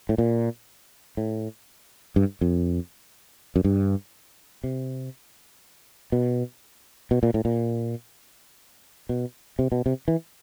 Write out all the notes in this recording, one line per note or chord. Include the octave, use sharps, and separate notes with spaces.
A2
A#2
A2
G2
F2
F#2
G2
C3
B2
B2
A#2
A2
A#2
B2
C3
B2
C3
E3